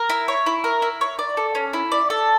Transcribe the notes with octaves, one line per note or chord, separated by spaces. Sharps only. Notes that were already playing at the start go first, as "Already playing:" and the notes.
Already playing: A#4
E4
C#5
E4
A#4
E4
C#5
D5
A4
C#4
E4
D5
A4